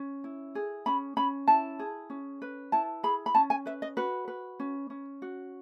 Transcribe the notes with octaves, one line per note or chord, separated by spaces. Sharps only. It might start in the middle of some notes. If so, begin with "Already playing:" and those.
Already playing: C#4
E4
G#4
C#4 B5
C#4 B5
E4 A5
G#4
C#4
B4
E4 A5
G#4 B5
B5
C#4 A5
G#5
B4 E5
D#5
F#4 B4
B4
C#4
C#4
F#4